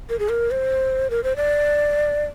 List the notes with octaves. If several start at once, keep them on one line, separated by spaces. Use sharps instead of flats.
A#4
G#4
A#4
C5
A#4
C5
D5